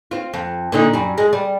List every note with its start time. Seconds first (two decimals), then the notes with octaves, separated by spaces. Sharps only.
0.11 C4 F4
0.34 F2
0.72 A#2 D3 D#4
0.93 F#2 G3
1.18 G#3
1.33 G3